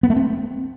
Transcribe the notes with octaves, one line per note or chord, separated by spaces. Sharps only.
B3
A3
C4